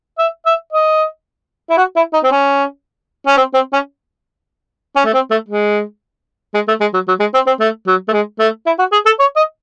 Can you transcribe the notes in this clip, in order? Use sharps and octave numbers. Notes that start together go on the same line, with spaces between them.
E5
E5
D#5
E4
F#4
E4
D#4
C4
C#4
C#4
C4
C4
C#4
C#4
A3
C4
A3
G#3
G#3
A3
G#3
F#3
F#3
G#3
C4
C4
A3
F#3
A3
G#3
A3
E4
F#4
G#4
A4
C#5
D#5